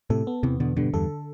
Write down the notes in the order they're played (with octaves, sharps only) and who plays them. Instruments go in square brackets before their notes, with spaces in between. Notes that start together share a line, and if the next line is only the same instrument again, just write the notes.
[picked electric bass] A2 C3 [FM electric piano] A4
[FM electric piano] B3
[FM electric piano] E2 [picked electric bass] C3 E3
[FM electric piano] E2 [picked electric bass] B2 D3
[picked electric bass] G2 B2 [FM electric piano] D3
[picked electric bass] E2 G2 [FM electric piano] A4